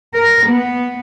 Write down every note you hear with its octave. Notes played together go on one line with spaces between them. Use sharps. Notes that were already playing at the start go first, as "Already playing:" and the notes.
A#4
B3